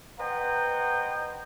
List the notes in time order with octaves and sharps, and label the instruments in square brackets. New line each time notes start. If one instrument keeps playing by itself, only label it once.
[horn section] B4 C5 D#5 F#5 G5 A#5